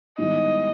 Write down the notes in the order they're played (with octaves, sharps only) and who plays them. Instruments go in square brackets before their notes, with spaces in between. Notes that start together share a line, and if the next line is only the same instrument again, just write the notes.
[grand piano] G#2 D#3 G3 B3 E4 [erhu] D#5